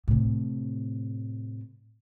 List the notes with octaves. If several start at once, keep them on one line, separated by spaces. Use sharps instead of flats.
A2 C3